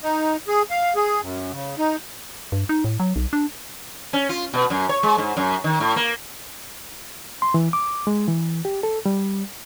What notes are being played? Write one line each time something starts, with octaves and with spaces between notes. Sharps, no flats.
D#4
G#4
F5
G#4
F#2
C#3
D#4
G2
D#4
A2
F#3
B1
D4
C#4
F4
B2
F#2
C#5
G#3
G#2
F#2
D#3
A2
A#3
C6
E3
D6
G#3
E3
G4
A4
G3